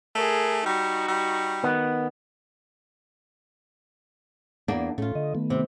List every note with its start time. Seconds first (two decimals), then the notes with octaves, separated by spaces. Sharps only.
0.15 A3 G#4 A#4
0.66 G3 D#4 F#4
1.08 G3
1.64 D#3 B3
4.68 E2 A#3 D4
4.98 A2 A3 C#4 F4
5.15 D3 D#5
5.35 D#3 A3 B3
5.50 C3